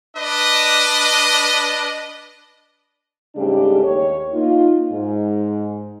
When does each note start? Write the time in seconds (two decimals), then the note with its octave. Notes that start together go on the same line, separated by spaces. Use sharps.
0.17 D4 B4 D5 D#5
3.35 G#2 C#3 G3 A3 D4 G4
3.84 D#2 C#5
4.33 A#3 D#4 F4
4.92 G#2